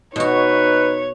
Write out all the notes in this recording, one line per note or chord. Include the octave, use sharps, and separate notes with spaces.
B2 D#4 F#4 B4 C#5